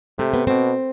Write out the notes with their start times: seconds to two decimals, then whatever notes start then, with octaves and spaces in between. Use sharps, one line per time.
0.19 C3 A3
0.33 B3
0.47 B2 C4